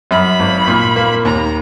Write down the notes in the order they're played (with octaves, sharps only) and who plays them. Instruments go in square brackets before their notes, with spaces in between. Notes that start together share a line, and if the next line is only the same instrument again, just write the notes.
[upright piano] F#2 [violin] B5
[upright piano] G#1
A#2
A#3
[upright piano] D#2 [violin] A#5